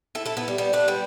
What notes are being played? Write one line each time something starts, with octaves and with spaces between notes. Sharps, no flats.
E4 A4
E4 A4
B3 E4
G3
G3 B3
A3 D4
G3 B3